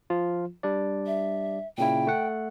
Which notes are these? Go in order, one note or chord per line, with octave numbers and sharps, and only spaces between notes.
F3 F4
G3 D4 D5
E5
A#2 C#3 E4 G5
A3 F#5